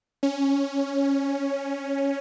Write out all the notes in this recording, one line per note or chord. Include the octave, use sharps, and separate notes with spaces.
C#4